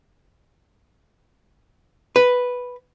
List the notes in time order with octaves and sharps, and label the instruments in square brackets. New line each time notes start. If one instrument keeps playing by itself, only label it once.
[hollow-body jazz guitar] B4